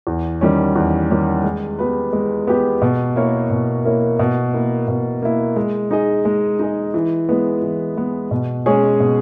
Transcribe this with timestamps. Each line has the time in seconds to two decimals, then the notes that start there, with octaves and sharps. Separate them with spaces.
0.07 E2
0.41 D#3 G3 C#4
0.76 E2
1.10 D#3 G3 C#4
1.44 G#3
1.79 B3 G4 B4
2.13 G#3
2.47 B3 G4 B4
2.82 B2
3.16 A#3 E4 A#4 C#5
3.50 B2
3.85 A#3 E4 A#4 C#5
4.19 B2
4.53 A#3 E4
4.88 B2
5.22 A#3 E4
5.56 G#3
5.91 D#4 G#4 D#5
6.25 G#3
6.59 D#4 G#4 D#5
6.94 E3
7.29 G#3 B3
7.62 E3
7.97 G#3 B3
8.31 B2
8.66 G#3 C#4 G#4 C#5
9.00 B2